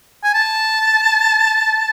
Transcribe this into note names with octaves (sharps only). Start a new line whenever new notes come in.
G#5
A5